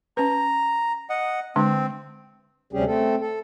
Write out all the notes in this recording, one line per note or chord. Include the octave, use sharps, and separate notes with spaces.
C#4 B4 A#5
D#5 F#5
D3 G#3 C4 D4
D2 C3 G3 C#4 G4 G#4
A3 C4 A4
A4